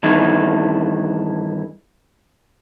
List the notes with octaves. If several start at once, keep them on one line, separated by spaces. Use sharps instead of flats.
G2 D#3 E3 E4